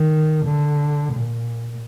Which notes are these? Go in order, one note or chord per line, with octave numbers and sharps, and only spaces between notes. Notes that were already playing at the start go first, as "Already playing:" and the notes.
Already playing: D#3
D3
A#2